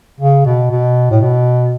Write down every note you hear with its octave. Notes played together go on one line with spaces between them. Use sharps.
C#3
B2
B2
A2
B2